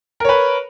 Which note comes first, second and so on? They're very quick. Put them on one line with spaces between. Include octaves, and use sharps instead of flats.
A#4 C#5 B4